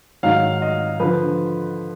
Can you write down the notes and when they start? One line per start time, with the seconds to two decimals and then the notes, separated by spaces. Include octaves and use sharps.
0.23 G#2 D#3 F#3 F5
0.62 D#5
1.00 D3 F3 B4